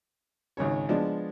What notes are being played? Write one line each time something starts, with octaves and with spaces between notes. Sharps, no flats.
G#1 C#2 C#3 C#5
F3 G#3 B3 D4